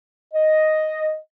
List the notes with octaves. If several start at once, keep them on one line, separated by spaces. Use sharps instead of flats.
D#5